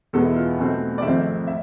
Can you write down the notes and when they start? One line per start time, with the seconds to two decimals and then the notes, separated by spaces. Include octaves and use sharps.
0.13 E2 B2 G#3 B3 A4
0.24 E4
0.36 F4
0.58 B1 B2 A3 C4
0.98 D5
1.02 G#1 G#2 F3 A3 C4 E5
1.47 E5